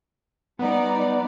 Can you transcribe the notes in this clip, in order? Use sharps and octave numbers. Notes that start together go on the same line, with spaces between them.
G3 B3 D#4 D5